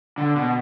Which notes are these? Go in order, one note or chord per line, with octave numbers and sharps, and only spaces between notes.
D3
B2